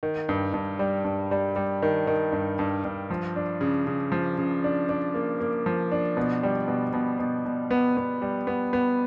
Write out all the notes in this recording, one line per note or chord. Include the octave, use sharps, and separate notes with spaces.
D#3
G2
G2
G3
G2
G3
G3
D#3
D#3
G2
G2
G2
F3
D4
C#3
C#3
F3
C#3
D4
D4
A#3
A#3
F3
D4
B2
G3
B2
B2
B2
B2
B3
B3
G3
B3
B3